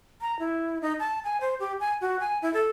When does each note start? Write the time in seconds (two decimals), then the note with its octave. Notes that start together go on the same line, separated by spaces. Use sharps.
0.21 A#5
0.39 E4
0.81 D#4
0.99 A5
1.24 G#5
1.41 C5
1.60 G4
1.80 G#5
2.01 F#4
2.20 G#5
2.42 E4
2.54 A4